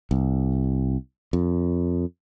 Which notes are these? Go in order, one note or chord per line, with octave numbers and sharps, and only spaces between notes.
C2
F2